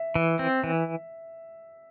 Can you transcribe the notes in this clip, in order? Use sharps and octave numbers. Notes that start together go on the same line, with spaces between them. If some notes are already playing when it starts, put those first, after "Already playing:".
Already playing: E5
E3
C4
E3